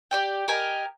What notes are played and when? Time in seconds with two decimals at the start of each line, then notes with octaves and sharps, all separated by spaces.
0.11 G4 D5 G5
0.48 G4 A#4 D#5 G#5